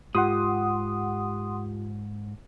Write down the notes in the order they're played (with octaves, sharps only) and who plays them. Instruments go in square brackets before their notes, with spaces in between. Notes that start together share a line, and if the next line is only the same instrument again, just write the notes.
[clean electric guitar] G#2 [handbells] F4 G4 [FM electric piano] F#5 C6 D#6